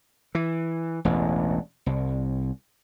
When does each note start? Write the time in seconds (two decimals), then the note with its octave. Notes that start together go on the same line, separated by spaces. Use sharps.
0.35 E3
1.05 E1 A1
1.86 C2